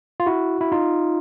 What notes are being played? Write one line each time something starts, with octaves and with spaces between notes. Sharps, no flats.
F4
E4 F#4
E4
D#4 F4